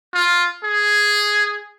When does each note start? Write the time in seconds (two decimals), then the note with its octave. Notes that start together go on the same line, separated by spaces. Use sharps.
0.14 F4
0.64 G#4